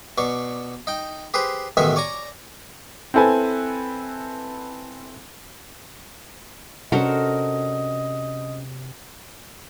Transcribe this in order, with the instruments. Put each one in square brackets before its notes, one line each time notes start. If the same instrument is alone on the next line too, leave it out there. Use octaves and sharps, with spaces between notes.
[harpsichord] B2 D5 C#6
D#4 G5
G4 G#4 B4 C5
A1 B2 D#3 G#3 E5 G#5
C#5 D5 G#5 A#5
[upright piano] C4 E4 A4 B4 G#5
[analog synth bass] C3 [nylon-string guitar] C#4 D4 A4 [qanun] F#4 A#4 C5 [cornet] D#5